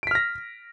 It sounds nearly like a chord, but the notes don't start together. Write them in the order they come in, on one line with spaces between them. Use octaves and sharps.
D7 B6 F6 A#6